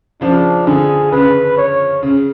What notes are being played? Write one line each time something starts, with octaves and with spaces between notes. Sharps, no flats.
C#3 F3 D4
D3 G#4
C#3 B4
C#5
C#3